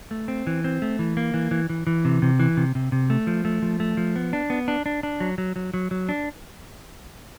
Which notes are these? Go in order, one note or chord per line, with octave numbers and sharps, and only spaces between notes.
A3
C4
E3
C4
A3
E3
A#3
E3
E3
E3
E3
C3
C3
E3
C3
C3
C3
A3
F3
A3
F3
A3
F3
B3
D4
B3
D4
D4
D4
F#3
F#3
F#3
F#3
F#3
D4